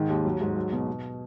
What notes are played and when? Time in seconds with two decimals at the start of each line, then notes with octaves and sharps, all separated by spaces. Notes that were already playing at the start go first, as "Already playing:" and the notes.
Already playing: G#2 D#3
0.09 D#2
0.25 F#3
0.41 G#2
0.56 F#3
0.72 B2
0.88 B2